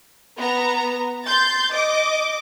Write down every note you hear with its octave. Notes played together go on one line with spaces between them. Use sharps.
B3 A#5
C6 G6 A6
D#5 D6